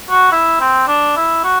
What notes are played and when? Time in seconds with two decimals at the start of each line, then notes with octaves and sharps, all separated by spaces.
0.10 F#4
0.32 E4
0.60 C4
0.88 D4
1.16 E4
1.44 F#4